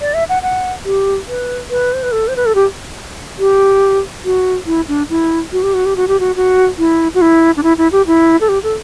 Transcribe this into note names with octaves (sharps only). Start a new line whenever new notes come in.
D5
E5
F#5
F#5
G4
B4
B4
C5
B4
A4
C5
B4
A4
G4
G4
F#4
E4
D4
E4
F#4
G4
F#4
G4
F#4
G4
F#4
F#4
E4
F#4
E4
D4
E4
E4
G4
E4
A4
G4
A4